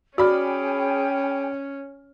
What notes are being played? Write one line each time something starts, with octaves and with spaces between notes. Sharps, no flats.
C#4 F#4 G#4 D5 G5 G#5 B5 F6